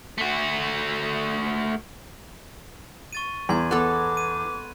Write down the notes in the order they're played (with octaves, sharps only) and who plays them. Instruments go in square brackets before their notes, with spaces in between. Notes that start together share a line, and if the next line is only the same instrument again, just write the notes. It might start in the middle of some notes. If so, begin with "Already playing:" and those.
[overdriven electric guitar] A3 F#4
[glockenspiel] C#6 A6 D#7
[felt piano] E2 [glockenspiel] C6 G#6
[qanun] B3 A4 [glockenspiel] B5 F#6 [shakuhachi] D6
[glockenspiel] D#7